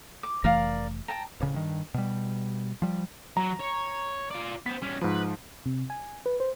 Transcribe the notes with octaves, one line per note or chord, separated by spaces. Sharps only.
D6
F1 E3 A3 A#4 D5 F5
G5 A5 A#5
D1 C#3
G2 D#3
B2 G3
F3 G3
F#3 A#5
C#5
F4 D5
B3 C5 B6
G3 C#4
G#2 F3 B4
C3
G#5
B4
C5